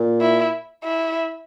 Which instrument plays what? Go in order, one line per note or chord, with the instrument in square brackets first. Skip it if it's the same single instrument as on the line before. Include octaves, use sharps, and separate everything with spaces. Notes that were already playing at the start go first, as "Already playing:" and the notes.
Already playing: [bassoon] A#2
[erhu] E4
E4